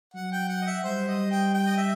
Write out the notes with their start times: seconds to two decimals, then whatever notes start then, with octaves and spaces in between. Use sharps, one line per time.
0.14 F#3 F#5
0.32 G5
0.49 F#5
0.62 D#5
0.67 E5
0.83 G3 C5
1.08 D#5
1.31 G5
1.54 G5
1.67 D#5
1.77 E5